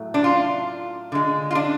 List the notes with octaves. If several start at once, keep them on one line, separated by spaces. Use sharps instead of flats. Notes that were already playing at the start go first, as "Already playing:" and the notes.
Already playing: A2 F#3 A3
D4
F4
D3 G#3
F4
D4